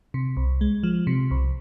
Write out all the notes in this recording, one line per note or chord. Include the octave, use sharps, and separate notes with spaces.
C3
C2
G#3
F3
C3
C2